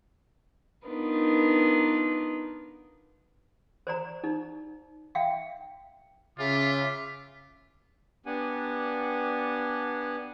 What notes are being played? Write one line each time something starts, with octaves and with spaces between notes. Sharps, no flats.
B3 D4 D#4 F4 A#4 B4
C5 D5 A#5
D#4
E5 F5 G5
C#3 F4 E5 D6
B3 D4 G4 F#5 G#5